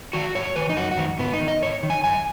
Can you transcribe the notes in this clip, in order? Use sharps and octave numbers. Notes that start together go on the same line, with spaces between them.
D#3 F#4
G#2 C#5
D#3 B4
D#4
F#2 F#4
F#4
D#3
G#2 B3
D#4
D#3
D#5
G#2 C#5
D#3
G#5
F#2 G#5